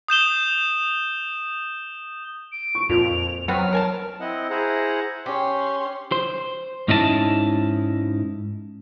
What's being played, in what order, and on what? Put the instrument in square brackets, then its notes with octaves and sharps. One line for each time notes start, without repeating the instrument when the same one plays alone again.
[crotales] D#6 G6 E7 G7
[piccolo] D7
[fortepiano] C#6
[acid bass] F2 [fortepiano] A#2 [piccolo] F7
[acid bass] F#3 [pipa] B3 C4 B4 [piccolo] F6
[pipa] A#4 G#5 A5
[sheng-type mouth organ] C4 E4 D#5 F#5
E4 G#4 C5 F#5 A#5
[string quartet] C#4 C6 [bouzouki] G4
[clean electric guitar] C5
G#2 C#4 D#4 E4 A#4 A5